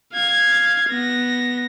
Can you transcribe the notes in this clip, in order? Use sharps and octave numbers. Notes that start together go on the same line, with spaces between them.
F5 G#6
B3 A#6